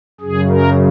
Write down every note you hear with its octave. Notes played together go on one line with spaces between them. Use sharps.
F#2 C#3 G#4
A#4